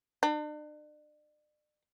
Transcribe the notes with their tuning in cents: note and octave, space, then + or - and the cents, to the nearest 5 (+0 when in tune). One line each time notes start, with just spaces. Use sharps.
D4 +40